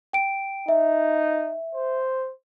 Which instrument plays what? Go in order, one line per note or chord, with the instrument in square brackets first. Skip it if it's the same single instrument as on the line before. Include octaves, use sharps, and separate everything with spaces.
[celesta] G5 D7
[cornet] D#4 [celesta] E5
[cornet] C5